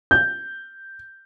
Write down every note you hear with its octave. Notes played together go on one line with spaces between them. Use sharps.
G6